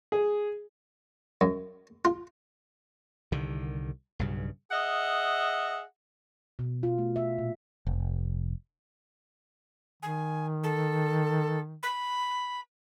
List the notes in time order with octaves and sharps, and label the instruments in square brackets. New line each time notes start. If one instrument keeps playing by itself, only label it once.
[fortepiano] G#4
[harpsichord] F#2
F4
[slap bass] C2 D3 D#3
B1 G2 C#3
[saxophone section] G#4 D#5 E5 F#5
[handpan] B2
F4
A3
E5
A#2
[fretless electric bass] F1
[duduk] D#3 [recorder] G#5
[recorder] A4
B5